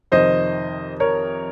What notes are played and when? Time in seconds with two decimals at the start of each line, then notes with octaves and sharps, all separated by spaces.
0.12 F2 C3 D#3 C5 D#5
1.00 A#4 C#5